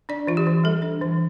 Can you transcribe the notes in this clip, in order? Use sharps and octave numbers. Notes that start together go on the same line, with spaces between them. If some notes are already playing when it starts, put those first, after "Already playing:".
D4 D5
E3 F4
G4
E3
G3 A4
D4
E3